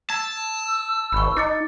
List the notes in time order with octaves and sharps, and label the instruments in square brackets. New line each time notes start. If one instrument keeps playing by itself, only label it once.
[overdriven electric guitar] A5 [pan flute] E6 [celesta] G#6
[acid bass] G#1 [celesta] B5 C#6
[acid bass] D#4 [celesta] D6 A6 C#7